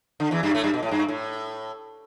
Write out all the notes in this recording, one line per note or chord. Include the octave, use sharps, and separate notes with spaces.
D3
E2 E3
G2 G3
A2 A3
G2 G3
B2
A2
G2
A2